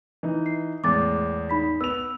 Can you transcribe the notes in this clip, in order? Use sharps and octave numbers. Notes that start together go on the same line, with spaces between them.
E3 D#4
C7
E2 A2 G#3 D6 A6
D#4 B5 B6
B3 E6 F7